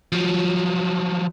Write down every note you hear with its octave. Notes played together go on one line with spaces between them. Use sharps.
F3 F#3